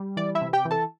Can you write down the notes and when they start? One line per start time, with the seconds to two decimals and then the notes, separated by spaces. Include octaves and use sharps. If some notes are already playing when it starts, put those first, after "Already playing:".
Already playing: G3
0.17 E3 D5
0.35 E4 E5
0.42 C3
0.53 G4 G5
0.65 E3
0.71 A4 A5